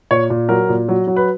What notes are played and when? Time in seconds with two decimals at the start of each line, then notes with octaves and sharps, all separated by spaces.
0.11 A#2 C#5
0.30 A#2
0.49 F#3 A#4
0.69 A#2
0.89 F#3
1.07 F#3
1.16 B4